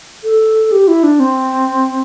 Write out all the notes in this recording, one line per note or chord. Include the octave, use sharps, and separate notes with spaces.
A4
G4
E4
D4
C4